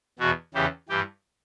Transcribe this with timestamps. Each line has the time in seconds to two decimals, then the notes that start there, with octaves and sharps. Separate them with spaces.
0.19 E2 B2 F#4
0.54 E2 C#3 E3 G4
0.89 G2 E3 G4